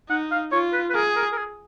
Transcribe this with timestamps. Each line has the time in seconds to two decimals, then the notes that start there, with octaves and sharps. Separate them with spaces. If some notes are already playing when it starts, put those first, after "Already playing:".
0.09 D#4 F#5
0.31 F5
0.52 F4 C#5
0.73 B4
0.90 B4
0.95 G#4 A#4
1.17 A#4
1.32 A#4
1.37 G#4